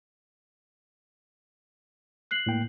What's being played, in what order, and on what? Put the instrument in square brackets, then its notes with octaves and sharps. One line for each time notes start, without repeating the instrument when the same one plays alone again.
[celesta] F#6 C7 F#7
[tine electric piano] A2 A#3 G5